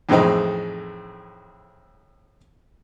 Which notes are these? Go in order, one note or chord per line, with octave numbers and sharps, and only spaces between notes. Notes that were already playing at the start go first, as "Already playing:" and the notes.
F2 A2 E3 G#3 C4 D#4